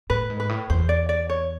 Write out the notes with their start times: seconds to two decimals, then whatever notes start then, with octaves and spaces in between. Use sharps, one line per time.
0.10 A2 B4
0.30 G#2
0.40 B4
0.49 A2
0.70 E2 C5
0.89 D5
1.09 D5
1.29 C#5